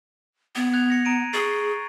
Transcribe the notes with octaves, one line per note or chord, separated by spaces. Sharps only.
B3 G#6 F#7
F#6 G#6 F7
A#6 C#7
A#5 D7 D#7
G#4 C#6 A6 C7